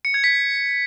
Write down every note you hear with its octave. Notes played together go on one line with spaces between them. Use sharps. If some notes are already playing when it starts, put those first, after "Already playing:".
C#7
G#6
B6